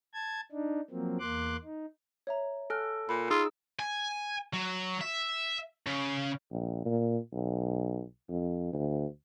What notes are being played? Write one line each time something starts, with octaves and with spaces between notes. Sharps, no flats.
A5 G#6
D4 D#4
F3 F#3 A#3 C4
E2 A#3 C6 D6 F#6
D#4
C#5 E5 A#5
A4 G#5 F6 F#6
A#2 B5
D#4 F4 G#4 E6
G#5
F#3
E5
C#3
A#1
A#2
B1
F2
D2